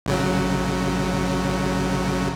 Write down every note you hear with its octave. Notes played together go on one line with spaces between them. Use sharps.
A1 C#3 F#3